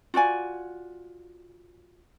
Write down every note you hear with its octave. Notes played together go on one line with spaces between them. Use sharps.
F4 F#4 D5 G#5